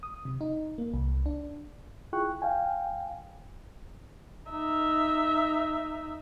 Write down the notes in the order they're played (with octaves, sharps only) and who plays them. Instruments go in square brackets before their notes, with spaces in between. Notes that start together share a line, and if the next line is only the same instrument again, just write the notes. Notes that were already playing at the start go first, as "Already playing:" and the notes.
[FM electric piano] D#6
C3
D#4
A#3
C2
D4
[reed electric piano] E4 F4 G#4 G5 C#6 F#6
F5 G5 G#5
[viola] D#4 E5